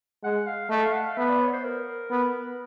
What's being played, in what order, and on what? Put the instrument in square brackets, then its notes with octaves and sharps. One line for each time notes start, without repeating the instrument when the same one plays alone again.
[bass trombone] G#3 [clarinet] F#5
[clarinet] F5
[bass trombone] A3 [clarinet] D#5
[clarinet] F5
F#5
F5
[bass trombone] B3 [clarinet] E5
[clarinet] D5
C#5
C5
A#4
[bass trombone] B3